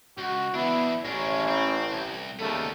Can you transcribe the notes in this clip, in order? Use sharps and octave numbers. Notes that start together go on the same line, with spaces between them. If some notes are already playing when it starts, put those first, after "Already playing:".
C#2 F#4
E3 B3 D4 E4
A1 G#3 C#4 D4
C4
C2
D#2 C#3 G3 A3 B3 A4